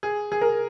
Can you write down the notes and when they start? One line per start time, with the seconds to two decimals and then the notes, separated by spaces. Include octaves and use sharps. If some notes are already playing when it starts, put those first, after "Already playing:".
0.03 G#4
0.32 G#4
0.41 A#4